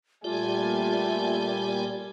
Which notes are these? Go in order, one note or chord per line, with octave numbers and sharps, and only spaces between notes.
A#2 G3 A3 F4 G4 D5 G#5